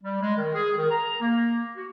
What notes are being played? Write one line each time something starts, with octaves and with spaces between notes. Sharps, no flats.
G3
G#3
D#3
G#4
D#3
A#5
A#3
F#4